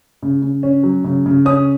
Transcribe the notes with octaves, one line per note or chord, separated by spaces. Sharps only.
C#3
C#3
C#4
F#3
C#3
C#3
C#4 D#6